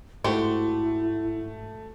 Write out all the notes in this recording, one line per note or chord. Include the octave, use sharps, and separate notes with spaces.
G#2 A3 E4 F#4 G4 C5